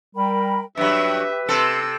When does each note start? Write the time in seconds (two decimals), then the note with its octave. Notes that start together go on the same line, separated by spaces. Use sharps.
0.15 G3 A#4 G5 B5
0.77 G2 F#3 G4 B4 E5
1.49 C3 A4 C6 E6